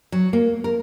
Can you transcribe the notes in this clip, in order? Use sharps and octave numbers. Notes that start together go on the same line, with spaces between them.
F#3
A#3
A#4